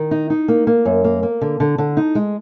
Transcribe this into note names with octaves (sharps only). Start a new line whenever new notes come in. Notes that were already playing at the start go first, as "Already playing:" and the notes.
Already playing: D#3
D#4
D#4
A#3
A#3
F#2
A#3
A#3
D3
D3
D3
D#4
G#3